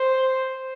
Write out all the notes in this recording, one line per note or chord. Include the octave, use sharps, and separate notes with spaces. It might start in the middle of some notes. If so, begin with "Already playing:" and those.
Already playing: C5